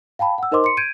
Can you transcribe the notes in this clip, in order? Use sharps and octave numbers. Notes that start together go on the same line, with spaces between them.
F5 G5 A5 B5
F#5 E6
D#4 A#4 C5 D#5 C6 D6
C6 C#7
G6 G#6 D7 D#7